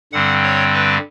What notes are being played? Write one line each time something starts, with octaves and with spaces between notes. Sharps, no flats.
G2 D3 G3 C4 F#5
C#5
B4